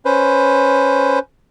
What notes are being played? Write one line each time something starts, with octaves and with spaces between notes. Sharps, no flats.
C#4 B4 C5